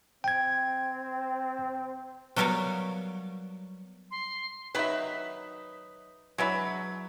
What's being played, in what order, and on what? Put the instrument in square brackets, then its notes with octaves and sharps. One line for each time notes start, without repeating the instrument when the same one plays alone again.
[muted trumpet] C4 [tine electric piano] G5 G#6
[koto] F#3 G3 B3 A#4 C#5 F5
[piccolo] C6
[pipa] D#3 F#3 D#4 [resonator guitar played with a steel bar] B4 E5
[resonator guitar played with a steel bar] F#3 B4 [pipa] G#3 D4 E4